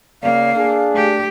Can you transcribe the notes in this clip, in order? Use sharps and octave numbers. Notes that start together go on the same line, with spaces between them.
C#3 A#3 D5 F5
D4 G#4
A3 G4